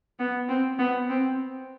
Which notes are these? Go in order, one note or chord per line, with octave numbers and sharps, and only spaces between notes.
B3
C4
B3
C4